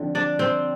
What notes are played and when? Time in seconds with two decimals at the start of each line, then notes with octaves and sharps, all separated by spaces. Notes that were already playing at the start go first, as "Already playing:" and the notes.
Already playing: D3 F3 C4
0.15 D4 D5
0.39 C4 C5